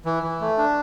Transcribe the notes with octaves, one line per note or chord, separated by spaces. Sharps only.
E3
E3
A3
D4